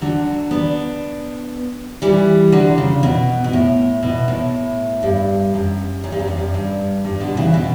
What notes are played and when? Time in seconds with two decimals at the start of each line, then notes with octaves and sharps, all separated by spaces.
0.01 D3 F#3
0.51 B3 D4
2.02 E3 G3
2.52 D3 F#3
2.78 C#3
3.03 B2
3.44 B2
3.53 A2
4.03 B2
4.28 A2
5.03 G2
5.54 F#2
6.04 F#2
6.12 G2
6.19 F#2
6.28 G2
6.37 F#2
6.54 G2
7.05 G2
7.20 B2 D3
7.37 C#3 E3
7.54 B2